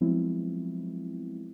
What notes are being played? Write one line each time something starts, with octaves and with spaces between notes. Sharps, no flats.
F3 F#3 G#3 B3 C4 E4